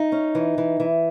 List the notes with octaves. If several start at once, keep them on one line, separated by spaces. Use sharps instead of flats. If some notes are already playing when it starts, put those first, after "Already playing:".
Already playing: D#4
C#4
E3
E3
E3